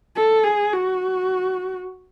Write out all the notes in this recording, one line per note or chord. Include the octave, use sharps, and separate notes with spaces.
A4
G#4
F#4